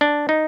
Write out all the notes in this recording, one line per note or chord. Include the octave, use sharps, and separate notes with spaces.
D4
D#4